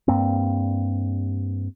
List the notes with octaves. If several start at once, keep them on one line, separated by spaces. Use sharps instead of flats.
G2 A#3 C4